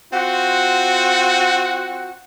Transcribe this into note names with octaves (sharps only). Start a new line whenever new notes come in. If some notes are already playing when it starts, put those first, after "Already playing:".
C4 F4 F#4